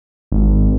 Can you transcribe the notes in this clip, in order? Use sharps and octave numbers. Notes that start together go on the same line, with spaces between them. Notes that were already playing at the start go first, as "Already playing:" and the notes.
G#1